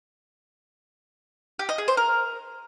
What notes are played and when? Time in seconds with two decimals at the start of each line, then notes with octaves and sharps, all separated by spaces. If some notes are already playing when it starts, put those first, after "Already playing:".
1.59 G4
1.69 D#5
1.78 G#4
1.88 C5
1.97 A#4